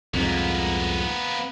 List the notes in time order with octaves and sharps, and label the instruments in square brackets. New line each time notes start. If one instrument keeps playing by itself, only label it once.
[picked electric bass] C2 F2 G#2 [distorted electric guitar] A#3 B3